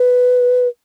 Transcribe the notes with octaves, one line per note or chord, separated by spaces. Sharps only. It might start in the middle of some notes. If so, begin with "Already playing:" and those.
Already playing: B4